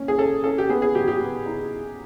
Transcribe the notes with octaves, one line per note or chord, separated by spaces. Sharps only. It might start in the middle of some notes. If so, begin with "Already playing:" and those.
Already playing: A#3 C#4
G#4
C#4 A4
C#4 A4
G4
B3 G#4
G#4
F#3 G4
G4
B3
D#4